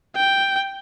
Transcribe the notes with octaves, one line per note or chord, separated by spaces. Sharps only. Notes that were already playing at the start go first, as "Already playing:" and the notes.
G5